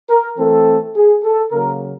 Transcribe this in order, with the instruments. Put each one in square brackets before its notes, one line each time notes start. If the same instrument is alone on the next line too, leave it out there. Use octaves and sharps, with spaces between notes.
[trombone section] A#4
E3 A3 C4 A4
G#4
A4
C#3 F#3 A#3 A#4